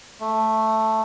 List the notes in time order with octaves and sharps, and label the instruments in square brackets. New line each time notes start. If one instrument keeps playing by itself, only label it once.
[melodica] A3